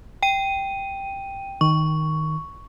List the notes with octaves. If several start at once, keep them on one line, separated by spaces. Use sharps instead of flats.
G5 D#7
D#3 C#6